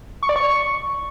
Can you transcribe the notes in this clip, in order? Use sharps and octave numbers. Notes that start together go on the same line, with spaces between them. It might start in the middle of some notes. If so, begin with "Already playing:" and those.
C#6
D5
C#6